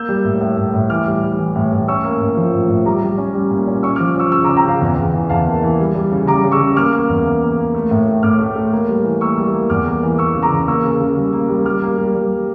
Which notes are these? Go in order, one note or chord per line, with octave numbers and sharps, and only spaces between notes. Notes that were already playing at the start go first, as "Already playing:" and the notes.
Already playing: A#3 E6 G6
G3
A2
A2
A2
A2
E3 D6 F6
G3
G3
E3
A2
A2
C#4 C#6 E6
A#3
A2
F3
A2
A2
G3 A#5 D6
G3
C#4
G3
A#2
C#4
C#4 C#6 E6
D6 F6
F3
C#4 C#6 E6
C#3 C#6 E6
A#5 D6
C#4
G5 A#5
C#3 F5
E2
E2
E3
E2 F5 A5
A#3
E3
G3
G3
C#3
G3 A#5 D6
C#3
C#6 E6
C#3
A#3 D6 F6
A#3
E2
A#3
A#3
A#3
A3
A2
A3
A2 D6 F6
A3
A3
A#3
G3
E3
A#3 C#6 E6
G3
A#3
E2 D6 F6
A#3
E3
E3 C#6 E6
C#3
A#5 D6
E2
A#3 C#6 E6
C#3
C#3
G3
A#3
G3
G3 D6 F6
A#3
G3
G3